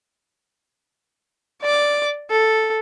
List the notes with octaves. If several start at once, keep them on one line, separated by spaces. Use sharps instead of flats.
D5 D6
A4